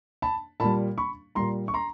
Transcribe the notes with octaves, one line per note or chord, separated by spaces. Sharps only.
A5 B5
A#2 G3 A5 B5
B5 C#6
A#2 G3 A#5 C6
C#6
A#5 C6